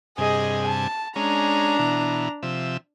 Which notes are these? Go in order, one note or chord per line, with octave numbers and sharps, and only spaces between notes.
G2 C3 G#4 D#5 G#5
A5
G#3 C#4 D4 A#5
B2 E3
C3 F3 E5